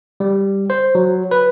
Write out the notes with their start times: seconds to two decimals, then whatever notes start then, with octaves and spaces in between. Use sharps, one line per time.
0.20 G3
0.70 C5
0.95 F#3
1.31 B4